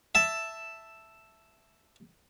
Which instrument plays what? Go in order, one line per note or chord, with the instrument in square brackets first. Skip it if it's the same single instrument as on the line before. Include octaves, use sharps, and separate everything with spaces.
[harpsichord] E5 A5